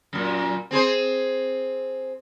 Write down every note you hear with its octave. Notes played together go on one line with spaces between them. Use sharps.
F#2 A#2
C4 G#4 C5